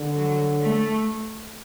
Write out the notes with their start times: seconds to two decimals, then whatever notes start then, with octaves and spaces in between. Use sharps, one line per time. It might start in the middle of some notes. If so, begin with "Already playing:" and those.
Already playing: D3
0.15 F#3
0.62 A3